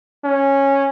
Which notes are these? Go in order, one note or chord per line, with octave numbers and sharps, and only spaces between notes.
C#4